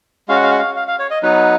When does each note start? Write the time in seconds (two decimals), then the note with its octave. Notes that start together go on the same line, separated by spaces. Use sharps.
0.28 G#3 C#4 F#4 F5
0.36 F#5
0.43 F5
0.51 F#5
0.58 F5
0.76 F5
0.88 F5
0.99 C#5
1.11 D#5
1.23 F#3 B3 D#4 B4